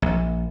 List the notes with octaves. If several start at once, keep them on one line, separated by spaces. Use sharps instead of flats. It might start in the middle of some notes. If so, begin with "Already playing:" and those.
A#1